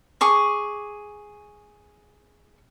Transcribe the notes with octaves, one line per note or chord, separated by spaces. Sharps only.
G#4 C#6 D6